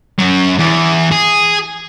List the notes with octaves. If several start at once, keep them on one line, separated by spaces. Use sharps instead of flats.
F#2 F#3
E2
G#4